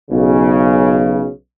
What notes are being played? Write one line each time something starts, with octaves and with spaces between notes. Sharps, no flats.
B1 C#3